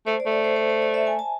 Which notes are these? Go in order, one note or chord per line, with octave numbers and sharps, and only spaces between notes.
A3 C5
D5
A3
D5
C5
C5
C5
D5
E5
G#5
A5